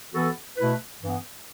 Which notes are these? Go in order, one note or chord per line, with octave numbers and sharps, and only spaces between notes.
E3 B3 F#4 A4
B2 A3 E4 B4
G2 E3 B3